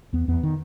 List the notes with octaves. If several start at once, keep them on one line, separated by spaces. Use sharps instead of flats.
E2 B3
E2 B3
D#3